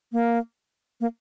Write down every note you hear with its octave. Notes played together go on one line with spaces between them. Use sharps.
A#3
A#3